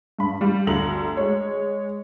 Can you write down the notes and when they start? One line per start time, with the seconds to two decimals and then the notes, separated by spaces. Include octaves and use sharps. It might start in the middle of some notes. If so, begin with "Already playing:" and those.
0.19 G2 B5
0.41 G3 F5
0.67 G1 D2 A#5 F#7
1.17 G#3 C#5